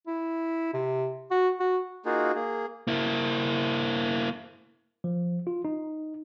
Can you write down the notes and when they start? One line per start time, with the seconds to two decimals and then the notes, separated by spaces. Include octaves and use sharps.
0.07 E4
0.74 C3
1.31 F#4
1.60 F#4
2.05 A#3 D#4 F4 F#4 G#4
2.35 A#3 G#4
2.88 A#3 E4
5.04 F3
5.47 F4
5.65 D#4